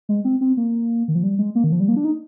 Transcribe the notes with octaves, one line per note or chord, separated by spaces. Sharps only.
G#3
C4
C4
A#3
D#3
F3
G3
G#3
A#3
D#3
F3
G3
A#3
D4
D#4